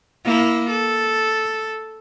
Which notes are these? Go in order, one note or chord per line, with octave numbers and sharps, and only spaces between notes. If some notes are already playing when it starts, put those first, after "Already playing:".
A#3 E4
A4